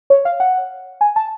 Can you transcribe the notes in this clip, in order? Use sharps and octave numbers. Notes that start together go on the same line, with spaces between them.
C#5
F5
F#5
G#5
A5